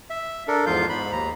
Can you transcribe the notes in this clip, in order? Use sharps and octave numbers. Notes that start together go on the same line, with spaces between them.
E5
D4 A4 A#4
E2 G#2 F3 F4 F5 G6
G#2 B5
D#2 A#5